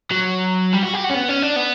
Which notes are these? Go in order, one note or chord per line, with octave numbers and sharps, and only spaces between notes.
F#3
G3
F#4
G4
F#4
C#4
B3
C#4
D4
B3